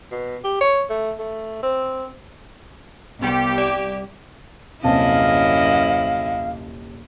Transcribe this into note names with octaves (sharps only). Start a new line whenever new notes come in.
B2
G4
C#5
A3
A3
C4
C2 B3 G4 G5
D5
D#1 F#2 C3 E4 D#5 F5 A5